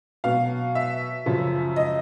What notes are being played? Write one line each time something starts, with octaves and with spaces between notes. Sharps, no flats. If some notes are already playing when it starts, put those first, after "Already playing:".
B2 F#3 F5
E5
F#2 C#3 F3
D#5